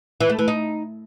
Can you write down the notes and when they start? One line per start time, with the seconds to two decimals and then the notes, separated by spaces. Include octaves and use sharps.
0.21 E3
0.30 A3
0.39 E3
0.48 D#4